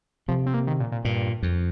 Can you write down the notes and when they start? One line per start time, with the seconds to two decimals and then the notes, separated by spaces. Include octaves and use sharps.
0.28 C3 F3
0.46 C4
0.54 A#3
0.67 D#3
0.80 A#2
0.92 A#2
1.05 G2 A#2
1.43 F2